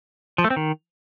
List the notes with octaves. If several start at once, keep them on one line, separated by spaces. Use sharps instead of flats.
F3
A3
C4
D#3